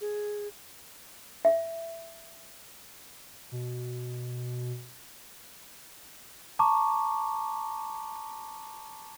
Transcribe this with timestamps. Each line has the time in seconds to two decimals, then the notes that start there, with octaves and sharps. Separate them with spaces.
0.01 G#4
1.45 E5
3.52 B2
6.59 A5 A#5 C#6 D6